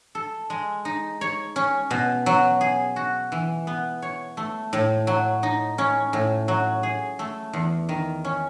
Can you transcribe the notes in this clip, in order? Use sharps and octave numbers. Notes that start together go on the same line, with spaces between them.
A4
G#3
D#4
C#5
C#4
B2
F#3
G#4
F#4
E3
B3
C#5
A3
A2
F#3
D#4
C#4
A2
F#3
G#4
A3
E2
D#3
C#4